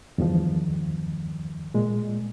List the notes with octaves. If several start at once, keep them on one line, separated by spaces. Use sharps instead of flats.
E2 G2 D#3 F3
A#2 G#3